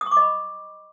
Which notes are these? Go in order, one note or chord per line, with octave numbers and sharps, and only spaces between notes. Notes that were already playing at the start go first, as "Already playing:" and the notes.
D#6
C#6
D6
D#5
B5